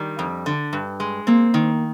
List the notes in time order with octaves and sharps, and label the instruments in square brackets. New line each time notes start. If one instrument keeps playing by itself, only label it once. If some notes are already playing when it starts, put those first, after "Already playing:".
Already playing: [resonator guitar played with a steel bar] D#3 G3 [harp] D4
[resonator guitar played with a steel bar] F2
D3
G2
G#3
[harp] A#3 [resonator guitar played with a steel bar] C4
[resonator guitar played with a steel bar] D#3